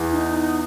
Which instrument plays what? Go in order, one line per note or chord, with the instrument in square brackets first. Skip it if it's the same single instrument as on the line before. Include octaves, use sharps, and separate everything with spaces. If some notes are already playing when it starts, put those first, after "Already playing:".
Already playing: [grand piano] E2 E3 [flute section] F#5
[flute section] D#4